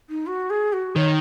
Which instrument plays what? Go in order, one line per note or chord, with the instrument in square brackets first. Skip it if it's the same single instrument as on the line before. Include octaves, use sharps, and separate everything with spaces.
[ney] D#4
F#4
G#4
F#4
[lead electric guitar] D#3 [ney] C#5